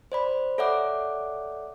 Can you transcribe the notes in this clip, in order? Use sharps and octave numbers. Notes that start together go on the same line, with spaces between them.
C5 D5 B5
A4 C#5 D5 E5 F#5 D6